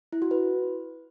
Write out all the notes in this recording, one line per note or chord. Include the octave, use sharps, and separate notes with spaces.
E4
F#4
B4